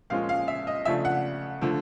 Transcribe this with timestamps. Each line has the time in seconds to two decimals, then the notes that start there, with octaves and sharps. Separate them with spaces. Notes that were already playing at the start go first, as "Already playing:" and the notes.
0.10 A#2 F3 G#3 C#4 F4 F5
0.29 F5
0.48 E5
0.67 D#5
0.85 C#3 F3 A3 D4 E5
1.05 F#5
1.61 D3 F3 A3